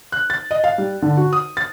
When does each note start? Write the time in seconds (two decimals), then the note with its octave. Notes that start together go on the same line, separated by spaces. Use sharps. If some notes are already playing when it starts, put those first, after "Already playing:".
0.12 F#6
0.30 A6
0.51 D#5
0.64 F5
0.78 G3
1.02 D3
1.17 F#4
1.33 D#6
1.57 A6